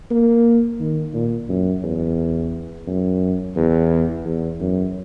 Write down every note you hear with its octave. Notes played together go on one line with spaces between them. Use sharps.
A#3
D#3
A#2
F#2
E2
F#2
E2
E2
F#2